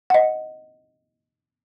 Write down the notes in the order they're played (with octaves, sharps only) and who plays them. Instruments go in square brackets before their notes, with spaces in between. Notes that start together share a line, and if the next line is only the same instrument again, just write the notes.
[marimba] D#5 F#5